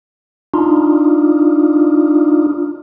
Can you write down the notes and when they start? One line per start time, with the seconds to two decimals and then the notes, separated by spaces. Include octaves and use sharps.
0.54 D4 D#4 F4